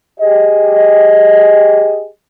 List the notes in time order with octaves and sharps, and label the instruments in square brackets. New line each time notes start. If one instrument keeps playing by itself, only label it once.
[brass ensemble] G4 G#4 D#5